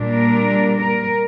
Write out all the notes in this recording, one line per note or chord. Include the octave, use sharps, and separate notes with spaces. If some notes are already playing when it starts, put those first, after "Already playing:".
Already playing: A#2 G3 A#3 D4
A#4
A#4